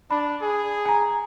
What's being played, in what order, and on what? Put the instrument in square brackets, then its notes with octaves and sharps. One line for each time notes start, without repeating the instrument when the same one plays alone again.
[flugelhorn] D4 [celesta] B5
[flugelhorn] G#4
[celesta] G#5 A#5